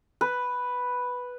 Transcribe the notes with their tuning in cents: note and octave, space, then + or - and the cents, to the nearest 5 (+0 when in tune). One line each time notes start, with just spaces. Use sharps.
B4 +0